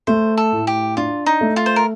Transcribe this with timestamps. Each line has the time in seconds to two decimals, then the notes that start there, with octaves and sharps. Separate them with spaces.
0.07 A3 C5
0.38 A4
0.52 A2
0.67 G4
0.97 D4 F4
1.26 D#4
1.41 A3
1.56 F4
1.66 C5
1.76 A#4